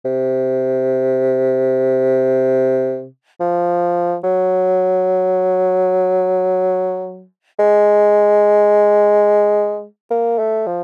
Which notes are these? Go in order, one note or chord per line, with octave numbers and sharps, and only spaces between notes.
C3
F3
F#3
G#3
A#3
A3
F3